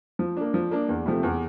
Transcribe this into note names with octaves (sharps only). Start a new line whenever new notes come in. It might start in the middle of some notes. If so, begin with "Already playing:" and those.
F3
A#3 D4
F3
A#3 D4
E2
C3 F3 A3
E2